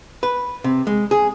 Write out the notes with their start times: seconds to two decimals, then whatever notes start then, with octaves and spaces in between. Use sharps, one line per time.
0.23 B4
0.64 C3
0.87 G#3
1.11 G#4